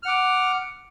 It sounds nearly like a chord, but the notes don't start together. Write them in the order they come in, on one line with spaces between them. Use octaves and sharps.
F6 F#5 D6